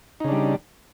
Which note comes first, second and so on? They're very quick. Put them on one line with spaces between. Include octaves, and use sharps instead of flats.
D#4 C#3 D4 G3